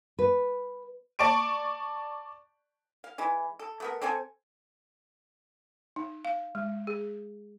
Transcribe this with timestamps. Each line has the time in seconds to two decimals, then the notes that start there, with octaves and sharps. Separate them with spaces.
0.19 B4
1.19 D5 A5 C#6 D7
3.04 F5
3.18 E3 G#3 E4
3.59 A4
3.80 A3 B3 A#4
4.02 C4 A4 C5 G#5
5.96 D#4
6.25 F5
6.55 G#3
6.87 G#4